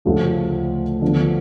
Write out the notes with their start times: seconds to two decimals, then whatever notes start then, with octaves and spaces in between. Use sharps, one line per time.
0.05 D2 C#3 F3 A3
1.02 D3 F3 B3